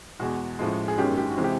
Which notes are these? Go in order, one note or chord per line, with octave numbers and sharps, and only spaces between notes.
E2 B2 G#3 F#4
A1 A2 F3 G#3
G#4
G1 F#2 D#3 G#3 C#4 G4
G4
F#4
C3 E3 G#3 C4
G4